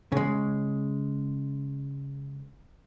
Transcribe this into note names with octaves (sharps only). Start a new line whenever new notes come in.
C#3 G#3